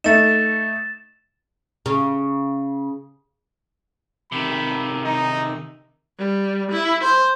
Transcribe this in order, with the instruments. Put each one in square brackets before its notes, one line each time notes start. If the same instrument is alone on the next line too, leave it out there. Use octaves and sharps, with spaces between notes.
[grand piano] A3 D#4 [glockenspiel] A6 E7
[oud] C#3
[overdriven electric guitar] C3 D#3 [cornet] B5
[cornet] D#4
[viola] G3
E4
C5